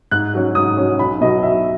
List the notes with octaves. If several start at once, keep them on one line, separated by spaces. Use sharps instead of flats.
G#2 F#6
F#3 C#4
G#2 D#6
F#3 C#4
B1 B5
B2 F#3 D#5
B1 E5